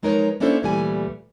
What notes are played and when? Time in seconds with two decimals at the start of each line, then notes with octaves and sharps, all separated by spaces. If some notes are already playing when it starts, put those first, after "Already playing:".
0.03 F3 G#3 D#4 A#4 B4 C#5
0.40 A#3 C#4 D4 E4 A4 C5
0.63 D2 A#2 E3 G3 A3 G#5